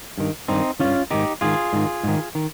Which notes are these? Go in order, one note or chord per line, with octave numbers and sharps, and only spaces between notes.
G2 D#3
G2 D#3 C4 D#4
G2 D#3 C#4 F4
G#2 D#3 D#4 G4
G#2 D#3 F4 G#4
G#2 D#3
G#2 D#3
D#3